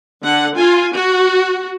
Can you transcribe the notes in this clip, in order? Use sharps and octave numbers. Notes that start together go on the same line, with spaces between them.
D3 F#5
F4 G#5
F#4